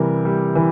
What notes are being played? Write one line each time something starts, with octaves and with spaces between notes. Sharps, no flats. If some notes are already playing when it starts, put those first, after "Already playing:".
Already playing: C3 E3 G3 A#4
G3
E3